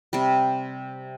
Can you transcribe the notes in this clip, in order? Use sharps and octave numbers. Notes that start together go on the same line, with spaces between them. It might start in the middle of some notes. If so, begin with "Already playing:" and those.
C3 G3